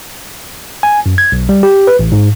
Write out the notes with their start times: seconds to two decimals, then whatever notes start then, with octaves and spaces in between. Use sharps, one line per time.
0.83 G#5
1.06 F#2
1.18 G#6
1.32 B1
1.49 G3
1.63 G4
1.87 B4
1.99 A1
2.12 G#2